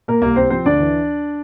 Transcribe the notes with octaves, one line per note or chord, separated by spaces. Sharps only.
A#2 A#3 A#4
C2 A#3 A#4
C2 C4 C5
F3 C4 C5
D2 D4 D5
E3